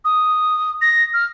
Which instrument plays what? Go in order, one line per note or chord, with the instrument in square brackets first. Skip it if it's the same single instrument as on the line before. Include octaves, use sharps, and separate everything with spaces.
[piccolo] D#6
A#6
F6